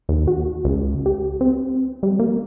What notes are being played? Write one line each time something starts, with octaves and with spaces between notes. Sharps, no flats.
D#2
F#4
C#2
G4
C4
G3
A#3